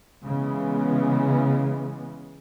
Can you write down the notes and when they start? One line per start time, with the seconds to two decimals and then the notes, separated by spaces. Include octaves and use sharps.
0.24 C#3 E3 G#3 B3